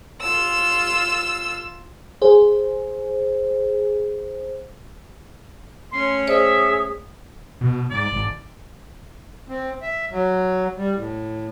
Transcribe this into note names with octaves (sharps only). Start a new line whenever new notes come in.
F4 E6
G#4 C5
A3 C#4 C#5 C6
G#4 C5 D5 E5
B2
G#2 D5
G#1
C4
E5
F#3
G3
A2